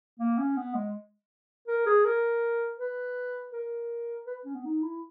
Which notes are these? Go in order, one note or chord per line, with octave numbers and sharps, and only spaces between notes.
A#3
C#4
B3
G#3
A#4
G#4
A#4
B4
A#4
B4
C#4
B3
D#4
E4